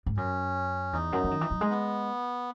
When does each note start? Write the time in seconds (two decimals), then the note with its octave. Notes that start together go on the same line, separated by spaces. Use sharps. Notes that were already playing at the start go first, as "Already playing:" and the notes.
0.06 G#2
0.17 F#2 C#4
0.93 E2 D#4
1.12 F#2
1.24 E3
1.31 D#3
1.41 E3
1.51 F#3
1.61 G#3
1.70 B3